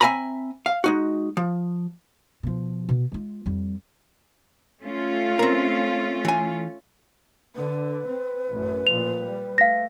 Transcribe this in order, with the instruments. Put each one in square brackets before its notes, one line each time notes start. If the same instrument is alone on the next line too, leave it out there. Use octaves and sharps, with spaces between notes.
[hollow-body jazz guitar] C4 E5 F5 G#5 A#5 B5
F5
G#3 D#4 F#4
F3
[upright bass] B2 F3
B2
G#3 F4
F2 G3
[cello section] A3 C#4 F4
[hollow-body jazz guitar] C4 A#4
E3 G#5
[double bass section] D3 [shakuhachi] B4
[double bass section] C4
A1 F#2
[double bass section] A#2 F3 [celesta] F7
[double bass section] G3
[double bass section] A3 [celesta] F5 A#6